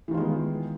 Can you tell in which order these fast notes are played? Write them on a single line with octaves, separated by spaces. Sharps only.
E3 D#3 F4 G#3 B3